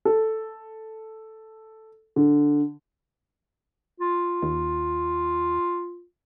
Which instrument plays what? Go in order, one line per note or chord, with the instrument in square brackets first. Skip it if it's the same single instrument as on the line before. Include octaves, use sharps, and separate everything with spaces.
[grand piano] A4
D3
[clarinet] F4
[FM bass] D#2